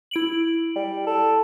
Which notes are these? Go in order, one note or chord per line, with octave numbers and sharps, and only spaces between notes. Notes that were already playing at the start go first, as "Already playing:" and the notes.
E4 D7 F#7
G3
A4